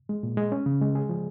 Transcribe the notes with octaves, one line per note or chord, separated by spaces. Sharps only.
G#3
A#2
G#3
C#4
C#3
G#3
G#4
F3